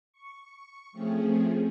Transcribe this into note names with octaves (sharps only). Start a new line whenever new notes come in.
C#6
F3 A3 C4 C#4 G#4